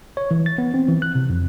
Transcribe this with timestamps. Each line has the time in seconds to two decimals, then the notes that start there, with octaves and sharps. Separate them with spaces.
0.17 C#5
0.31 E3
0.46 A6
0.58 B3
0.74 C4
0.88 E3
1.02 F#6
1.15 C3
1.30 F2